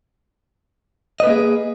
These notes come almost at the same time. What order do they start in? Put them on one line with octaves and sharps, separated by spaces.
D#5 B4 A#3 G#4